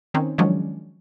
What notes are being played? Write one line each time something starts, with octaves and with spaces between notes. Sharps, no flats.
D#3 C4 C#4 D#4
D#3 F3 F#3 G#3 C#4 D4